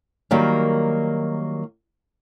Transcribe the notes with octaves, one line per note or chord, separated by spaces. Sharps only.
D#3 F#3 G3 A#3